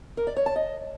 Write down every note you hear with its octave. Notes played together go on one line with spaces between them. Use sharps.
A#4
D5
C#5
A5
D#5